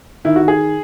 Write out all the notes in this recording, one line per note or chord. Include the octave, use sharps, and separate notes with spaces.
D#3 E4
F#4
D#3
G#4